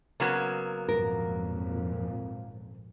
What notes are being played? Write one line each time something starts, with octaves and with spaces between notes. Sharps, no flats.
C#3 F#3 A#3 B3
G#1 F2 A#2 A#4